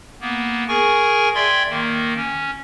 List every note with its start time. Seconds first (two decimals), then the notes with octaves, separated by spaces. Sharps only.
0.21 A#3 B3
0.68 G#4 A#4 G#5 C#6
1.35 D5 E5 G5 C6 G#6
1.69 D#3 A#3
2.15 C#4